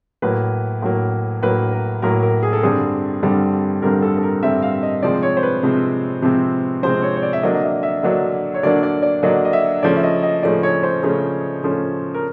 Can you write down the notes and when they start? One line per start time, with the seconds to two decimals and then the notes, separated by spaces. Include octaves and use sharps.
0.22 A2 F#3 A#3 B4
0.82 A2 F#3 A#3
1.42 A2 F#3 A#3 B4
1.72 A#4
2.02 A2 F#3 A#3 A#4
2.23 A#4
2.43 G#4
2.53 A4
2.63 G2 D3 G3 C4 G#4
3.23 G2 D3 G3 C4
3.82 G2 D3 G3 C4 A#4
4.02 A4
4.18 A4
4.23 A#4
4.43 G2 D3 G3 C4 E5
4.62 F5
4.83 D#5
5.03 C3 F3 G#3 C4 D5
5.23 C#5
5.37 C5
5.43 B4
5.63 C3 F3 G#3 C4
6.22 C3 F3 G#3 C4
6.83 C3 F3 G#3 C4 C5
7.02 C#5
7.16 C#5
7.23 D5
7.33 E5
7.43 D3 F#3 A#3 D4 D#5
7.54 D#5
7.63 E5
7.83 E5
8.03 D3 F#3 A#3 D4 D#5
8.54 C#5
8.63 D3 F#3 A#3 D4 D5
8.83 D5
9.03 D5
9.23 D3 F#3 A#3 D4 D#5
9.45 D#5
9.53 E5
9.83 C#3 F3 A3 C#4 D5
9.96 E5
10.03 D#5
10.23 D#5
10.43 C#3 F3 A3 C#4 D5
10.63 C#5
10.83 C5
11.03 C#3 F3 A3 C#4
11.63 C#3 F3 A3 C#4
12.14 A#4